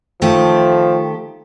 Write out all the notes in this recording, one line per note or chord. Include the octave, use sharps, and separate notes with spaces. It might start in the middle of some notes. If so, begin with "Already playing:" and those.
D#3 F3 A3 G4